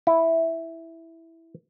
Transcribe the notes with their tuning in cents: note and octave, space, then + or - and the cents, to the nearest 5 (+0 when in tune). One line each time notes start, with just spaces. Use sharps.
E4 -5